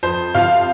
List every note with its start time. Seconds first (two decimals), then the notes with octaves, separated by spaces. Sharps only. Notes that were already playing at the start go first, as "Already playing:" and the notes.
0.03 F2 C5
0.34 C3 F3 F5